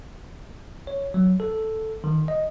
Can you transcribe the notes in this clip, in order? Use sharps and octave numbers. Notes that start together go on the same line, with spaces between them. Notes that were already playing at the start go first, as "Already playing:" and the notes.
C#5
F#3
A4
D#3
D#5